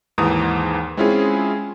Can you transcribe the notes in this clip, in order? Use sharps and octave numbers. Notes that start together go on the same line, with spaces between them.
D#2 G#2 E3 A#5 D#6
G#3 C4 C#4 E4 F4 G#4